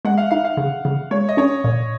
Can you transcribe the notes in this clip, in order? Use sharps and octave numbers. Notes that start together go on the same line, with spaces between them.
G#3 F#5
F5
D#4 F5
F5
C#3
C#3
G#3 C#5
D#5
C#4 C#5
A#2